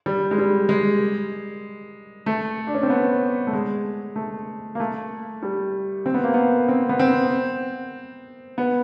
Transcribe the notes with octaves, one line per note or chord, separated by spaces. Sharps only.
G3
G#3
G3
G#3
A3
D4
C#4
C4
B3
A3
G#3
A3
A#3
A3
G3
C4
B3
A#3
B3
C4
B3
C4
B3